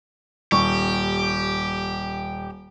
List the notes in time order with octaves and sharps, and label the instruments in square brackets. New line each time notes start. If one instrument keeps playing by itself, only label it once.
[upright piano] D#1 C#6 [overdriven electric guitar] G4